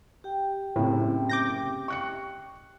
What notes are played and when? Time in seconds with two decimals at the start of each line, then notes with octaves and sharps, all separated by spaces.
0.24 G4 G5
0.76 F#1 A2 C3
1.29 D6 G6 A#6
1.88 C#6 F#6 C#7